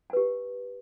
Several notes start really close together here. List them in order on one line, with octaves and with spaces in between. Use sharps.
G#5 B4 G4